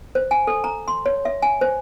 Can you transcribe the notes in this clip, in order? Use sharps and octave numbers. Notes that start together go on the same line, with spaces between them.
C5
G#5
A4
A#5
C6
C#5
E5
G#5
C5